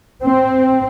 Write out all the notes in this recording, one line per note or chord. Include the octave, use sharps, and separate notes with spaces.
C4